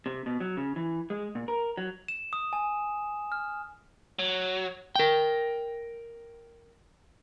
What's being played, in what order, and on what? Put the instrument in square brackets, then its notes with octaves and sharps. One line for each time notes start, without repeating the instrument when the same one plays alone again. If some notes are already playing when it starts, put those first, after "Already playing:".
[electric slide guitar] C3
B2
F#3
C#3
E3
G#3
A#2
A#4
F#3
[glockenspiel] E7
D#6
G#5
F6
[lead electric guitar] F#3
[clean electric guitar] A#4 G5